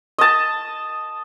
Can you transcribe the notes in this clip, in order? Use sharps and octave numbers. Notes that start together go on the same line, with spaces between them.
D#5 A5